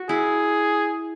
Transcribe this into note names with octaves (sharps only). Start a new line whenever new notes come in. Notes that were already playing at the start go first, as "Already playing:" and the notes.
Already playing: F#4
E4 G#4